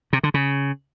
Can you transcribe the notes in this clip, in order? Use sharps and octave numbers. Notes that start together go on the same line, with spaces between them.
C3
D3
C#3